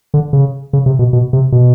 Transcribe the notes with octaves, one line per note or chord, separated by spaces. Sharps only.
D3
C#3
C#3
C3
B2
B2
C3
B2